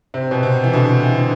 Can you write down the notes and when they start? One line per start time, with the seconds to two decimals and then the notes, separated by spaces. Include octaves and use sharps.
0.14 C3
0.31 B2
0.43 C3
0.64 E3
0.73 B2 D3
1.03 E3
1.15 D3